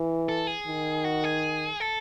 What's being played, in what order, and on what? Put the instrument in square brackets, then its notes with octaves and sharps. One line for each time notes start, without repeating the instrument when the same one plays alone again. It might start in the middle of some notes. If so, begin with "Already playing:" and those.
Already playing: [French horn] E3
[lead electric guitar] A4
G#4
[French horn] D#3
[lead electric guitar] F#4
G#4
A4